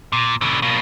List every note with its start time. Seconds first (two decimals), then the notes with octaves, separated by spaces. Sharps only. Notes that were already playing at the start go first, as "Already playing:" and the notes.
0.12 A#2
0.41 B2 D3
0.62 B2 A#3